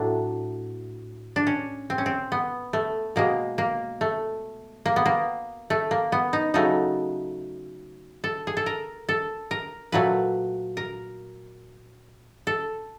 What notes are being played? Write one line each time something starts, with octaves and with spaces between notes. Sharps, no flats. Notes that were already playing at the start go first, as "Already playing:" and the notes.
Already playing: A2 F#3 A3 D4
D4
C#4
C4
C#4
C4
B3
A3
B2 G#3 A#3
A#3
A3
A#3
B3
A#3
A3
A#3
B3
D#4
C#3 F#3 A3 D#4
A4
G#4
A4
A#4
A4
A#4
A#2 F#3 A3 B4
A#4
A4